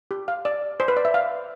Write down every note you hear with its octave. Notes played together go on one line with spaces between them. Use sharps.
G4
F5
D5
C5
B4
D5
E5
F5